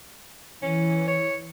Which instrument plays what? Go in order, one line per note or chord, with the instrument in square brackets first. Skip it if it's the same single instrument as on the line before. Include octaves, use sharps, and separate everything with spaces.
[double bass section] E3 [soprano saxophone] C#4
[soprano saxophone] C#5